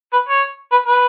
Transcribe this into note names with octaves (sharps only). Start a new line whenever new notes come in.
B4
C#5
B4
B4